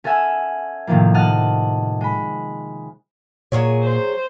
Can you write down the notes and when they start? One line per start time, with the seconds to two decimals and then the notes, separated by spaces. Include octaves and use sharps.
0.04 C#4 A4 E5 F#5 G#5
0.87 A2 C3 D#3 F3 A#3
1.14 D#5 F#5 A5 F6 F#6
2.01 G#3 B5
3.52 A#2 F#3 G#4 C#5
3.83 C5